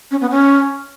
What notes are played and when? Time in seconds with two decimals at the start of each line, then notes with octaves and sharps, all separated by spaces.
0.11 C#4
0.21 B3
0.31 C#4